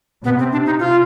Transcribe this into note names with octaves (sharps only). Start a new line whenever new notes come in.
C3 B3
C4
D4
D#4
F4